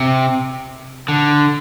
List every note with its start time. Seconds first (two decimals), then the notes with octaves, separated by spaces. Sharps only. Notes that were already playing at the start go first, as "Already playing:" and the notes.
Already playing: C3
1.08 D3